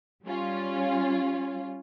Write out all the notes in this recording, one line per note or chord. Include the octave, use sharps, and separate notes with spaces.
G3 C#4 F4